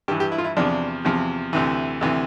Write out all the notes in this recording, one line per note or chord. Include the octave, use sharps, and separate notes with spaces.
G2 E3 G4
G4
E4
F4
E4
E2 C3 F3 D4
E2 C3 F3
D2 C3 E3
D2 C3 E3